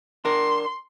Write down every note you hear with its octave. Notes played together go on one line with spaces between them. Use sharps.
D4 A#4 C6